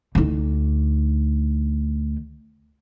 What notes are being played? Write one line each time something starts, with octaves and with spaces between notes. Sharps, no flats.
D2 D#4